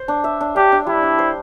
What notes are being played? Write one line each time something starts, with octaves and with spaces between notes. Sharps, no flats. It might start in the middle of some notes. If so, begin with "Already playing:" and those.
Already playing: C5
D4
E5
D4
D4 G4
D4
G3 E4
D4
C5